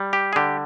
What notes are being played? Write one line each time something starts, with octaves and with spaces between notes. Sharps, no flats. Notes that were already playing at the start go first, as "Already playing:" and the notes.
Already playing: G3
G4
G#4
D3 G4